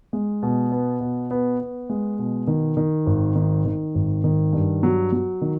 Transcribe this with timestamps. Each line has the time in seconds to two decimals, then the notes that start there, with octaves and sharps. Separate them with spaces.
0.13 G#3
0.42 B2
0.72 B3
1.00 B2
1.31 B3
1.60 B3
1.90 G#3
2.19 B2
2.47 D#3
2.77 D#3
3.07 G#1
3.35 D#3
3.65 D#3
3.95 G#1
4.24 D#3
4.53 G2
4.83 F#3
5.12 F#3
5.41 D#3